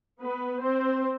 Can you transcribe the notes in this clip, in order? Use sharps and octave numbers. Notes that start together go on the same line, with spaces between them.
B3 B4
C4 C5